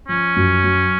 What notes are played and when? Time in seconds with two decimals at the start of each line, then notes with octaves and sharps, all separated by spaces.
0.08 F3 C#4
0.36 F#2
0.64 F#3